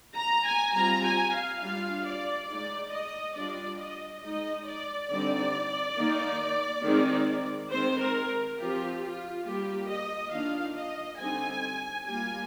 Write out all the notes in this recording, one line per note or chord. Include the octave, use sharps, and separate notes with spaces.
A#5
G#5
G3 C4 F4 A#5
G#5
F5
G3 D4 F4 F5
D5
G#3 D#4 D5
D#5
G3 D4 F4 D5
D#5
G#3 D#4 D#5
D5
D3 G3 C4 D#4 D5
D#3 A#3 D#4
D#3 G#3 C4 D#4
D#3 G#3 C4 C5
A#4
F3 C4 F4 G4
F4
G3 A#3 F4 G4
D#5
D#3 A#3 D4 F4 F5
D#5
D3 G3 C4 D#4 G#5
G3 A#3 F4 G#5